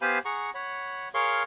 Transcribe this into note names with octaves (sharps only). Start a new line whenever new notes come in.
B3 G4 C5 F5 G#5 B5
G#4 F#5 A#5 C#6
C#5 F#5 B5
G#4 A#4 C#5 F5 C6 C#6